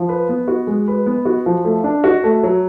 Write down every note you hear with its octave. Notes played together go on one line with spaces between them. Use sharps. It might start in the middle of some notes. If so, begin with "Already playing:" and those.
Already playing: F3
B4
B3
F#4
G#3
B4
B3
F#4
F3
A3
D4
F#4
A3
F#3